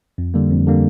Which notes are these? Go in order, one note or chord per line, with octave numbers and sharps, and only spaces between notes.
F2
D3 G3 A#3
F2
D3 G3 A#3